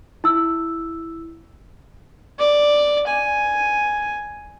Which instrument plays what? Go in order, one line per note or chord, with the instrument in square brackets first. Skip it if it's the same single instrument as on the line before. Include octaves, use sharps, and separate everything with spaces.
[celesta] E4 E6
[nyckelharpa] D5
G#5